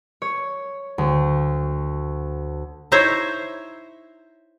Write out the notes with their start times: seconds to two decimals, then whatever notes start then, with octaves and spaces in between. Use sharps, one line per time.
0.22 C#5
0.98 D2
2.92 D#4 E4 C5 C#5 E5